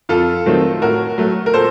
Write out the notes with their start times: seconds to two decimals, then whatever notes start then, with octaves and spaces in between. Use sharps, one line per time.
0.09 F2 F4 A4
0.46 D#3 F#3 A3 C4
0.82 A2 F#4 A#4
1.18 F#3 A3
1.46 A#4
1.54 A#2 A4 C5